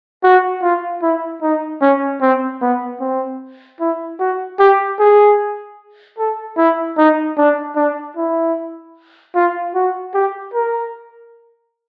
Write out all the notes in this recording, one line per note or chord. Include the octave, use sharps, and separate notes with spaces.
F#4
F4
E4
D#4
C#4
C4
B3
C4
E4
F#4
G4
G#4
A4
E4
D#4
D4
D4
E4
F4
F#4
G4
A#4